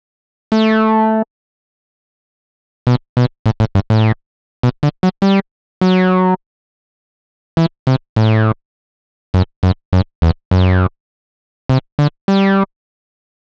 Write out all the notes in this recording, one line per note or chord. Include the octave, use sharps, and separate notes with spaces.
A3
B2
B2
A2
A2
G2
A2
B2
D3
F#3
G3
F#3
E3
C3
A2
F#2
F#2
F#2
E2
F#2
C3
D3
G3